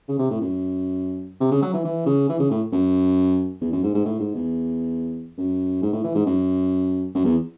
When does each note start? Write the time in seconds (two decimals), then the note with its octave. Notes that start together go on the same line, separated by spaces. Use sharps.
0.08 C#3
0.19 C3
0.30 A2
0.41 F#2
1.40 C3
1.52 C#3
1.62 F#3
1.74 E3
1.85 E3
2.06 C#3
2.29 E3
2.40 C#3
2.51 A2
2.72 F#2
3.61 E2
3.72 F#2
3.84 G#2
3.94 G#2
4.05 A2
4.19 G#2
4.35 E2
5.38 F#2
5.82 G#2
5.93 A2
6.04 E3
6.15 G#2
6.26 F#2
7.15 F#2
7.25 E2